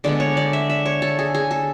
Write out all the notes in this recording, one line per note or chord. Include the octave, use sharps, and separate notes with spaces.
D3 G#3 B3 D5
C#5
D5
E5
E5
C#5
A4
G#4
G#4
A4